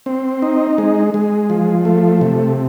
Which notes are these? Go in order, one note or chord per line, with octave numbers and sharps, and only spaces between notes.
C4
D#4
G#3
G#3
F3
A3
C3